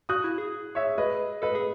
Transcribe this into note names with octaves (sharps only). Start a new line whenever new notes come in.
F#4 D#6 F#6
E4
G#4
C#5 E5
B4 D#5
A4 B4 D#5
G#4